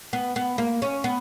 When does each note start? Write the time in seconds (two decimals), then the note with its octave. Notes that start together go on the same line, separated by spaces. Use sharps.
0.13 B3
0.36 B3
0.58 A#3
0.82 C#4
1.04 B3